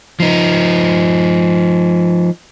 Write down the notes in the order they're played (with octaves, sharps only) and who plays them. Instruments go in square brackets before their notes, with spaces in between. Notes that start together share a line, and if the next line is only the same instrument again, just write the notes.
[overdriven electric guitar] F3 D#4